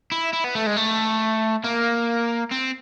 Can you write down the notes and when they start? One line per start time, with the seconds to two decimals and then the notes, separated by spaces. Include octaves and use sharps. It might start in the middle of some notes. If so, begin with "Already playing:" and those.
0.12 E4
0.33 E4
0.44 B3
0.55 A3
0.67 G#3
0.77 A3
1.64 A#3
2.51 C4